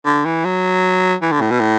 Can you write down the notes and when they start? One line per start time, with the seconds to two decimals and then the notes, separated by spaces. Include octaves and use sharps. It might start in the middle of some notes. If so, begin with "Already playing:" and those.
0.06 D3
0.25 E3
0.45 F#3
1.22 E3
1.32 D3
1.41 A2
1.51 B2
1.60 A2